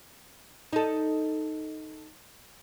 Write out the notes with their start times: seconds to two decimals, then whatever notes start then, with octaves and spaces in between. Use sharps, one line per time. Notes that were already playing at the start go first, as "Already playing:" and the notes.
0.73 D#4 A4